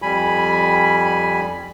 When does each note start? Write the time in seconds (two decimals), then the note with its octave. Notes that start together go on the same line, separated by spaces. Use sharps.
0.02 F2 G3 G#5 B5